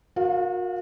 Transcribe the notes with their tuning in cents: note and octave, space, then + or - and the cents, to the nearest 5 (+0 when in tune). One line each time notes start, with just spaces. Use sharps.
F#4 -40 A#4 +0 F5 +0